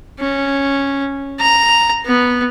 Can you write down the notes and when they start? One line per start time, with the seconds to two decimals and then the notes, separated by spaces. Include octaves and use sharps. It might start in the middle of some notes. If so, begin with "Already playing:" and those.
0.19 C#4
1.39 A#5
2.06 B3